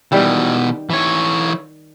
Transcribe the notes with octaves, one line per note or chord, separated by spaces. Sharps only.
B2 D#3 E3 G3 G5
E3 C#5